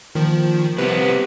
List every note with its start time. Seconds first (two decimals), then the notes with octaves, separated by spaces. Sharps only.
0.15 A#2 D#3 F3
0.78 C2 C3 B3 B4